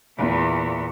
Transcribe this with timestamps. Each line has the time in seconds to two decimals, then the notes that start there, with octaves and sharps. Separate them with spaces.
0.17 E2 A#2